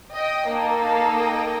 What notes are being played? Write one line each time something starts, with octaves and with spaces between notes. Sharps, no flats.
D#5 G5
A#3 D#4 A4
F5 A5
D#5 G5